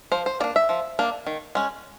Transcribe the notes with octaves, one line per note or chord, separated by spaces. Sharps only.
F3 C5
C5
A#3 D4 D5
E5
F3
A#3 D4
D#3
G#3 C#4